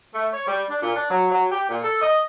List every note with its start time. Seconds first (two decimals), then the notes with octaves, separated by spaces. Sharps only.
0.13 A3
0.33 C#5
0.47 G3
0.70 D4
0.82 A#2
0.95 D4
1.10 F#3
1.31 F#3
1.51 G4
1.69 A#2
1.83 A4
2.01 D#5